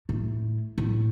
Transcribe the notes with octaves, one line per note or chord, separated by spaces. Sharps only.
A2
A2